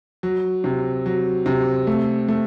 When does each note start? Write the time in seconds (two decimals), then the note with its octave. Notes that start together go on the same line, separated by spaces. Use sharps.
0.23 F#3
0.64 C3
1.06 F#3
1.46 C3
1.87 A3
2.28 A3